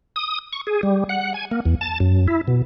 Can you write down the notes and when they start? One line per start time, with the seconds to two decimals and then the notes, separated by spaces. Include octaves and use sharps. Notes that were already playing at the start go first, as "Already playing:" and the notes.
0.16 D#6
0.53 C#6
0.67 G#4
0.83 G3
1.09 F#5
1.34 G#5
1.51 A#3
1.65 E2
1.81 A5
2.00 F#2
2.28 E4
2.48 B2